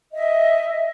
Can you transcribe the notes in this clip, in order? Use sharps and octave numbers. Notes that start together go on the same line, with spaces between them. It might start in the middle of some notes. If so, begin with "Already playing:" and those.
D#5 E5